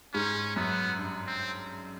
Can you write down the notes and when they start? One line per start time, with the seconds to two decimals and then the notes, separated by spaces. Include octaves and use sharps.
0.14 G#2 C#4
0.56 F#2 B3
0.99 G2
1.27 C4